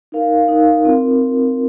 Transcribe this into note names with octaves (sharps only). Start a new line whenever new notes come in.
D#4 A#4 F5
D#4 A#4 F5
C4 F4 A#4